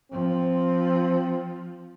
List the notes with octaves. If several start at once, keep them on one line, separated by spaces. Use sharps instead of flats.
F3 C4